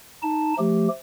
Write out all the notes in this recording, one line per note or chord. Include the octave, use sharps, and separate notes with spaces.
D#4 A5
F3 A3 G4